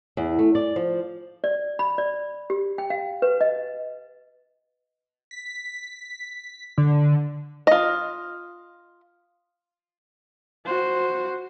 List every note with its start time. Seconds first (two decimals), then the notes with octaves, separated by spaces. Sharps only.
0.17 E2
0.39 A3
0.55 D5
0.76 F3
1.44 D5
1.79 B5
1.98 D5
2.50 G4
2.78 G5
2.90 F5
3.22 B4
3.41 D#5
5.31 B6
6.78 D3
7.67 F4 D#5
10.65 F#4 C5